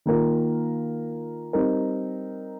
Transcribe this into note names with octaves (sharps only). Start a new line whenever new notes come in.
D#3 A#3 F4 A#4
G3 C4 D#4 A#4